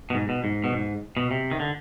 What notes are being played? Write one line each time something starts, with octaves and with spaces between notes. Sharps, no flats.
B2
G#2
B2
G#2
B2
G#2
B2
C3
D#3
D3